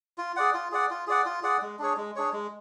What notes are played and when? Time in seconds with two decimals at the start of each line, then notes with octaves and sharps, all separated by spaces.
0.18 F4
0.36 G#4 D5 F#5
0.54 F4
0.72 G#4 D5 F#5
0.91 F4
1.07 G#4 D5 F#5
1.26 F4
1.43 G#4 D5 F#5
1.62 G#3
1.79 D4 G#4 C#5
1.97 G#3
2.16 D4 G#4 C#5
2.33 G#3